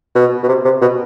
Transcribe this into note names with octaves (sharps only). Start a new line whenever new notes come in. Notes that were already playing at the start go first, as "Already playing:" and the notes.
B2
B2
C3
C3
B2